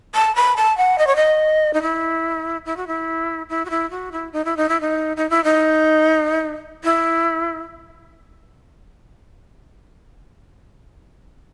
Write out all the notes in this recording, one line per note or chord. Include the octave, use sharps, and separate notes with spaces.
A5
B5
A5
F#5
D#5
C#5
D#5
D#4
E4
E4
F#4
E4
E4
F#4
E4
F#4
E4
D#4
E4
D#4
E4
D#4
D#4
E4
D#4
E4